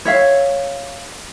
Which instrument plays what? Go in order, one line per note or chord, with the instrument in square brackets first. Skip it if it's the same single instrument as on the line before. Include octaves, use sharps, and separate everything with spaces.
[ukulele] C#5 E5 F5